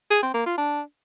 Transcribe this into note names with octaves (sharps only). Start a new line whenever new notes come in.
G#4
C4
A#3
F4
D4